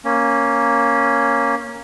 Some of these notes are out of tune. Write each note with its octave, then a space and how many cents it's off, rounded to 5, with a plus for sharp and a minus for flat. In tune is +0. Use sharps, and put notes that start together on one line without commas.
A#3 +0 C#4 +0